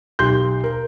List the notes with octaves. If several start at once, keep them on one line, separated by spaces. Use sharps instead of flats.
B1 G4 C6 G6
A#4